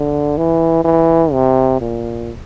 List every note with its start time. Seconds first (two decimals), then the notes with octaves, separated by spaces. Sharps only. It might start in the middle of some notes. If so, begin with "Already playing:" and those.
Already playing: D3
0.38 E3
0.85 E3
1.32 C3
1.81 A#2